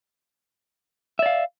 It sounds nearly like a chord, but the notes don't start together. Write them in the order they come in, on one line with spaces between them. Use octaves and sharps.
E5 D5 F5